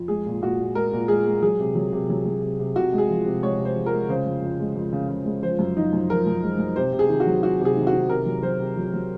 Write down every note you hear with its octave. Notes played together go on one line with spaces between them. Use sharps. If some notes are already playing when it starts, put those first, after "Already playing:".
Already playing: F2
G#3 G#4
A#2
A#2 F#4
A#2
G#3 A#4
A#2
G#3 G#4
G#3
F#3 G#4
C3
F#3
C3
F#3
F#3
C3
C3
C3 F#4
G#3
G#4
F3
C3
G#3 C#5
C3
C5
F3
A#4
G#3
C#3 C5
F2
F2
G#3
F2
C#3
C#3
G#3
F3 C5
F#2
F3 D#4
F#2
F3 A#4
F#2
G#3
F#2
C3 C5
C3
G#4
D#3
F#4
F#3
D#3 F#4
C3
G#4
D#3
F#4
D#3
C3 A#4
F#3
F#3 C5
C3
F#3
F#3